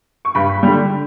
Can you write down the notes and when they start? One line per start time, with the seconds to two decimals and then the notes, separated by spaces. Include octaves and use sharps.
0.25 C#6
0.35 G2 B5
0.63 D3 G3